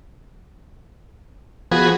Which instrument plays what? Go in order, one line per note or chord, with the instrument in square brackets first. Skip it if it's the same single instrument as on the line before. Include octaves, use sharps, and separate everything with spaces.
[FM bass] F3 [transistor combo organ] B3 F#4 G#4